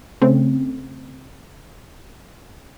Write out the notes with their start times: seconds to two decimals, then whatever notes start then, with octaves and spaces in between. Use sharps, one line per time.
0.21 C#3 A3 C4 C#4